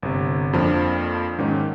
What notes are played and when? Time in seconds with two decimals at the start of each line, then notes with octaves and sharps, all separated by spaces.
0.03 G1 C3
0.53 F2 F3 A#3 D4 F4
1.38 G#2 D#3 C#4 D#4